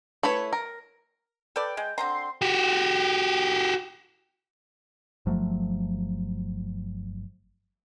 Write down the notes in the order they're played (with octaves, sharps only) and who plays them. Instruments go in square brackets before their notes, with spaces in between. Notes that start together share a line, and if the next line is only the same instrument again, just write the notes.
[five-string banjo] A3 E4 B4 C#5
A#4
[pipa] A4 B4 D5 [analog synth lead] G5
[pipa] G#3
[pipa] D3 C4 A#5 [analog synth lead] C6
[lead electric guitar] F#4 G4
[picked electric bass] G1 F3 F#3 A3